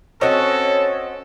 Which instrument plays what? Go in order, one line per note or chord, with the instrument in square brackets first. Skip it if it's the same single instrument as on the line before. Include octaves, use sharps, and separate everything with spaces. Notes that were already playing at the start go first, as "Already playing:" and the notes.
[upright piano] C4 D#5 [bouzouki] C#4 F#4 [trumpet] A4 [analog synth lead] C#5